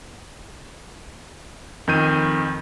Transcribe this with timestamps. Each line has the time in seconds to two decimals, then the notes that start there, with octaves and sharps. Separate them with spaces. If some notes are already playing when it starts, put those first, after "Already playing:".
1.87 F2 D#3 G6 D#7